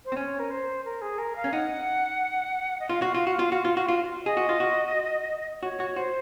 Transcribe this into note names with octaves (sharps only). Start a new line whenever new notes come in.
C5
C4
C#4 C#5
A#4
C5
A#4
G#4
A#4
F5
C#4
D#4 F#5
D#5
F4 F5
F#4
F4
F#4
F4
F#4
F4
F#4
F4
G#4 D#5
F#4
F4
F#4
F#4 C#5
F#4
F#4 C5